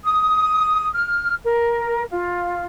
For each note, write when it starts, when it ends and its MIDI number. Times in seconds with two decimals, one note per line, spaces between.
0.02 0.87 87
0.93 1.33 89
1.43 2.03 70
2.09 2.64 65